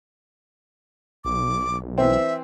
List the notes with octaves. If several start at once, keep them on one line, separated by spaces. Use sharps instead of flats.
B1 D6
E3 C4 E5